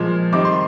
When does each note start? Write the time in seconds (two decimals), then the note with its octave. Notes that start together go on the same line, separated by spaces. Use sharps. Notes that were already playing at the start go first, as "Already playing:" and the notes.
Already playing: A#2 F3 G#3
0.32 D#3 G3 C4 D#4 D6
0.45 C6